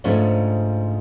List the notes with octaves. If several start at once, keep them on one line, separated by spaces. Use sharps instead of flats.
G#2 C#3 F3 A3 C#4 D4